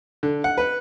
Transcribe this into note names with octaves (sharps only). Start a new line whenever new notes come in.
D3
F#5
B4